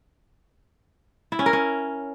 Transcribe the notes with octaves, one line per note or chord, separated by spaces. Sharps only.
E4
C#4
A#4
C#4